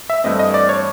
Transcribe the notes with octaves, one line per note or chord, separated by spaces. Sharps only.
E5
G2 E3 A3 C4 D#5
D#5
D5
C#5